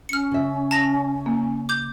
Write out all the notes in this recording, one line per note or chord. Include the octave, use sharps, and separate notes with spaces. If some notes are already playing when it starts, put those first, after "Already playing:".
C#4 F6 C#7
C#3 E5
A5 A#6 F7
A#3
D6 G6